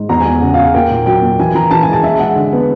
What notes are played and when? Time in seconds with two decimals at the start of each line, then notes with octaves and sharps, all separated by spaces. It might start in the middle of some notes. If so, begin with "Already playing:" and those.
Already playing: G#2
0.09 E2 A#5
0.20 G#5
0.25 E2
0.41 C#3 F#5
0.54 C#3 F5
0.64 F#5
0.75 A#3 G5
0.90 A#2
1.06 F#3 G5
1.22 A#3
1.39 E3 G#5
1.55 E3 A#5
1.71 E3 A5
1.83 G#3 G#5
1.93 A5
2.03 G#3 E5
2.19 G#3 F#5
2.36 D3
2.53 B3